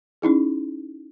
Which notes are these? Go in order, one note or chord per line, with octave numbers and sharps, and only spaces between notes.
C#4 D#4 E4 G#4